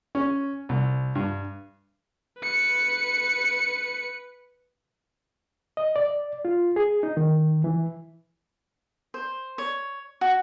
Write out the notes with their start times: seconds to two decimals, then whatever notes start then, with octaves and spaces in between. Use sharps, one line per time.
0.15 C#4
0.69 C2
1.15 G2
2.41 B4 C#7
5.77 D#5
5.96 D5
6.45 F4
6.76 G#4
7.03 D#4
7.17 D#3
7.64 E3
9.14 C5
9.58 C#5
10.21 F#4